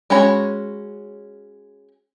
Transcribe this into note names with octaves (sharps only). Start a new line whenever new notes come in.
G#3 C#4 F#4 C#5 B5